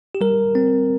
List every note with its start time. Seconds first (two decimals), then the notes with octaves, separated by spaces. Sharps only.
0.15 G4
0.21 G3 A#4
0.55 C4